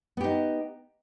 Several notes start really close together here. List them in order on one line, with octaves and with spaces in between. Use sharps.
B3 G4 D#4